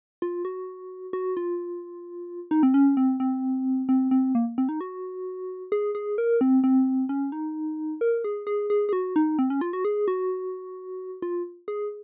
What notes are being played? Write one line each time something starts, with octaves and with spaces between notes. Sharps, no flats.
F4
F#4
F#4
F4
D#4
C4
C#4
C4
C4
C4
C4
A#3
C4
D#4
F#4
G#4
G#4
A#4
C4
C4
C#4
D#4
A#4
G#4
G#4
G#4
G#4
F#4
D#4
C4
C#4
F4
F#4
G#4
F#4
F4
G#4